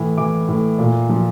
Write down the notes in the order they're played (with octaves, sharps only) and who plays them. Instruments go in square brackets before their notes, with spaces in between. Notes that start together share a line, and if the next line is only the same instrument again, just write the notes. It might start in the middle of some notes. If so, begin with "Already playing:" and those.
Already playing: [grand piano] A2 E3
E3 D6
A2
A#2
F3